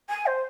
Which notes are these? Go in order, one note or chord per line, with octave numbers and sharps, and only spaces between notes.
G#5
C5